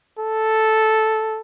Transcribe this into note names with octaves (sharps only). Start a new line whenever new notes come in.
A4